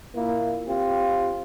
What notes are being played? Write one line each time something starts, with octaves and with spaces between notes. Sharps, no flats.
A#2 A#3 E4
C4 F4 G4